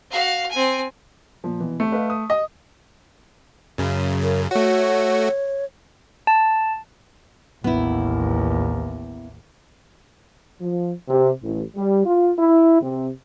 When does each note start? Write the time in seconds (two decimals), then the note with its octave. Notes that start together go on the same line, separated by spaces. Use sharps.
0.11 F#4 F5
0.51 C4 G#5
1.44 A#2 F3
1.60 B2 E3
1.80 A3 C4
1.92 B4 D#5 F5
2.10 D#6
2.30 D#5
3.78 F#2 C#3
4.23 A#4
4.51 A3 F#4 C#5
6.27 A5
7.64 A1 D#2 B3 E4
10.61 F3
11.09 C3
11.43 A1
11.75 G3
12.05 F4
12.39 E4
12.82 C3